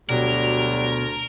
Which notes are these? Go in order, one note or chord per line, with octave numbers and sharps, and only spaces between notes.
D2 B2 F#3 G3 A#4